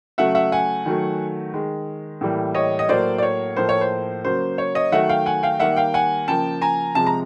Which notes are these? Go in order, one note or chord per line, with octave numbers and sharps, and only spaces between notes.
C#3 F#3 A3 E5 F#5
E5 F#5
F#5 G#5
D#3 F#3 A3
D#3 G#3
A2 E3 G3 A#3
C#5 D#5
D#5
A2 F#3 A#3 C5 D5
D5
C#5
A2 F3 A#3 C5
C#5
C5
C#3 F#3 A#3 C5
C#5
C#5 D#5
D#3 F#3 A3 E5 F#5
F5 G5
F#5 G#5
F5 G5
D#3 G3 A#3 E5 F#5
F5 G5
F#5 G#5
C#3 F3 A#3 G5 A5
G#5 A#5
C3 F3 G#3 A5
A#5